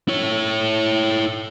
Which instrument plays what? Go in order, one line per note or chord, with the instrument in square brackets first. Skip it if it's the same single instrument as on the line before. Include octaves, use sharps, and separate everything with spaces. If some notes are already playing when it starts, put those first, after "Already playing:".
[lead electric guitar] E4 C#5